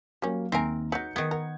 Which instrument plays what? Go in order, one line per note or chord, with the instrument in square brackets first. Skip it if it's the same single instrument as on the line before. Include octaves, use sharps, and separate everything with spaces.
[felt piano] F#3 A#3 [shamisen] G3 C#4
[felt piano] D#2 A#5 [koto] C4 A#4 [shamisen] E5 G#5
[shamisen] F#3 D#4 [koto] B4 [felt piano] G6 C#7
[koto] D#3 B3 [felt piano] A#4 G#6
[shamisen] A#4 [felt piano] F#5